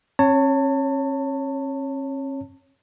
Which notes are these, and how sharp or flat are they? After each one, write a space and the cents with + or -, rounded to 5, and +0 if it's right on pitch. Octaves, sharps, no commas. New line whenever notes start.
C#4 -45 C#5 +0 A5 +30